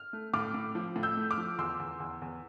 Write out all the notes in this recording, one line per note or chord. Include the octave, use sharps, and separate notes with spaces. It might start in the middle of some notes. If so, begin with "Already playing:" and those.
Already playing: F6
A3
A2 D6 F6
A2
F3
A2
E6 G6
A3
D6 F6
F3
E2 C6 E6
E2
E2
E2